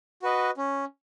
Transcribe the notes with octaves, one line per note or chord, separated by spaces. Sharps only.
F#4 B4 D#5
C#4